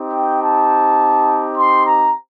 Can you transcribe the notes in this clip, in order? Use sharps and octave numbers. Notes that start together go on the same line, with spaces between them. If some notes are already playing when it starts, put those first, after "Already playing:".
Already playing: C4 D#4 G4
G5
A5
C6
A#5